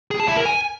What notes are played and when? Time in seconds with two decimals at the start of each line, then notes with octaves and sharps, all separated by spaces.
0.11 G#4
0.20 A5
0.28 E4
0.37 A#4
0.45 G#5